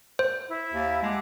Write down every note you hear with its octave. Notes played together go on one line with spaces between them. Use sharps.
C5
E4 E5
D#2
G#3 F#5 A5 D6